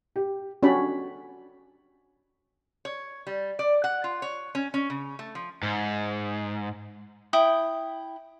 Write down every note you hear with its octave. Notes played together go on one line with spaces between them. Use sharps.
G4
C#4 D4 F#4 G4 D5 B5
C#5
G3
D5
F#5
F4
C#5
C#4
C#4
C#3
A3
F3
G#2
E4 G5 D#6